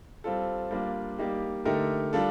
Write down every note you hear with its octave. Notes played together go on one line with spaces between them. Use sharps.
G3 C4 F4 A4
G3 A#3 D4 F4
G3 A#3 D#4 G4
D3 A3 D#4 G4 A#4
G3 D4 F4 A4